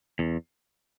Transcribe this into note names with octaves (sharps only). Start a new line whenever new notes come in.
E2